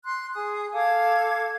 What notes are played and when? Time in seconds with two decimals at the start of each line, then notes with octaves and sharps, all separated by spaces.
0.05 C6 F#6
0.35 G#4 D#6
0.73 A4 F5 D6 G#6